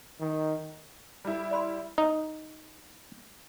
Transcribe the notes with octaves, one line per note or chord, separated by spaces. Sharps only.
D#3
G3 E4
D5 B5 C6
D#4